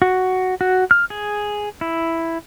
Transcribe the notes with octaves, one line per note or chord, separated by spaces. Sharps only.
F#4
F#4
F6
G#4
E4